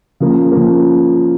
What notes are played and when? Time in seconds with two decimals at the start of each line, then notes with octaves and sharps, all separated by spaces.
0.20 C#3 F3 A#3
0.52 C#3 F3 A#3